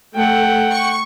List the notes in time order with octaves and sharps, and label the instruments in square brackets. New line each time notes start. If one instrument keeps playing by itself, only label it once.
[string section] A3 [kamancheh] F#5 G5
[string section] C#6